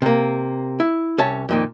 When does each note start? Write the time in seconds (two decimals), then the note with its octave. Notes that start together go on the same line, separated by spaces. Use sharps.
0.02 C3 A#3
0.80 E4
1.18 C2 C#4 C#5 E5 A5
1.49 F2 A#2 D#3